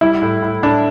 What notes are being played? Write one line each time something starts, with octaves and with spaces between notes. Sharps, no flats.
G3 E4
A2
A2
A2 D4